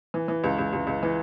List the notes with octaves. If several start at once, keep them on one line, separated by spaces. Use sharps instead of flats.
E3
E3
C#2
C#2
C#2
C#2
E3